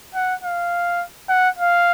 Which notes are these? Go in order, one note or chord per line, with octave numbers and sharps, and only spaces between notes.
F#5
F5
F#5
F5